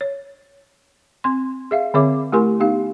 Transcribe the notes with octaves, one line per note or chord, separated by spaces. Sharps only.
C#5
C4 C6
G#4 E5 F5
D3 C4 G#4 C#5 E5 D6
A3 E4 G4 A#4 G#5 C6
B3 D#4 G4 F5